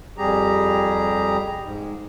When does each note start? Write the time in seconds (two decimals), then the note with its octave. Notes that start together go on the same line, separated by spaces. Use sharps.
0.18 F2 G3 G4 G#4 A#5
1.63 G#2